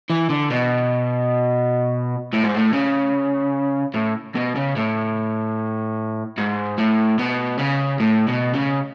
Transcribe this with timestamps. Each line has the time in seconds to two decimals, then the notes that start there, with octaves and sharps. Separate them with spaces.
0.10 E3
0.30 D3
0.50 B2
2.33 A2
2.44 G#2
2.54 A2
2.73 C#3
3.94 A2
4.35 B2
4.55 C#3
4.76 A2
6.38 G#2
6.78 A2
7.19 B2
7.59 C#3
8.00 A2
8.28 B2
8.54 C#3